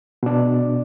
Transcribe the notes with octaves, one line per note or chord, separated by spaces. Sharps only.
B2 D4